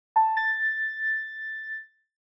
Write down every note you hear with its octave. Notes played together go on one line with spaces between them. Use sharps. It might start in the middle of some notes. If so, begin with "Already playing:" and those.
A5
A6